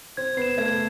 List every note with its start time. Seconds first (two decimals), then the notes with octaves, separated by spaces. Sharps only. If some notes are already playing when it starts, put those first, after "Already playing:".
0.17 C4 G#6
0.37 B3 C7 E7
0.58 A3 G#6